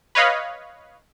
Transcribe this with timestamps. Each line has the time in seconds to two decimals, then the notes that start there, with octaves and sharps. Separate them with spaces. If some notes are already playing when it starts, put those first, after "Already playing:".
0.15 B4 C#5 D#5 F5 B5